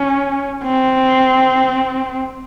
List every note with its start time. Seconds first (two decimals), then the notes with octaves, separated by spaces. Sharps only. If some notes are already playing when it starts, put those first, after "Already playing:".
Already playing: C#4
0.64 C4